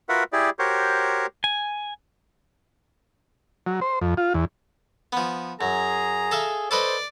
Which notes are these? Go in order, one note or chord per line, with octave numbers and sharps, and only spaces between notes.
F4 F#4 A#4 B4 E5 F#5
E4 G4 G#4 D5
F#4 G4 A#4 C5 C#5
G#5
F#3
C5
F2
F4
E2
F3 B3
F#2 G#4 A#5
A4 E5 F5
A4 B4 C5 D5 D#5